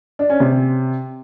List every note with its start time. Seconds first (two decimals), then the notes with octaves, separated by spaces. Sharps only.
0.19 D4
0.30 C#4
0.40 C3